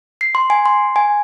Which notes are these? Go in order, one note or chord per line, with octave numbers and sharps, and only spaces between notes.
C7
C6
G#5
C6
G#5